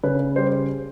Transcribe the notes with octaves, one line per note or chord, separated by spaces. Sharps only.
C#3 B4
G3 C5